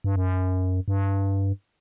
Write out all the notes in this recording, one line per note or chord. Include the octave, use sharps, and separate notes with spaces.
G2
F#2
G2